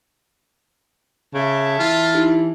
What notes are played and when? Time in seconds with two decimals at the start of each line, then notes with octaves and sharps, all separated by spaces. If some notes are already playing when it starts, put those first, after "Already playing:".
1.34 C#3 E5 A5
1.79 E3 F4
2.15 D#4 E4 G4